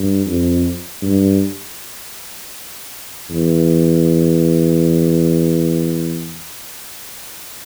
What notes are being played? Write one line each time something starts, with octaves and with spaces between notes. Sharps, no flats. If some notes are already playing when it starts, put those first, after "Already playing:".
Already playing: G2
F2
G2
E2